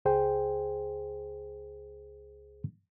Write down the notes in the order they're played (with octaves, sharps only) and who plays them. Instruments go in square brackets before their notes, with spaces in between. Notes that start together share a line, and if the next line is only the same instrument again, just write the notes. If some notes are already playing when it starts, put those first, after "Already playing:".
[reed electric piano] C#2 G#4 C5 G5